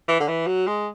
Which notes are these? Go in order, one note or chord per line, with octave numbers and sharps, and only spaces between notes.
E3
D3
E3
F#3
G#3